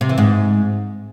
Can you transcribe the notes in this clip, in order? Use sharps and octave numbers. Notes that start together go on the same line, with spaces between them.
C3
E3
G#2